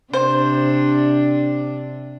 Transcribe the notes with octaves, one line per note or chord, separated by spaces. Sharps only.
C3 D4 C5